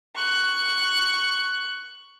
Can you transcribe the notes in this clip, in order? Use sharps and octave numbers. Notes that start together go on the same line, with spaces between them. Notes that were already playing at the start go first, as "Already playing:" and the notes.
C#6 F#6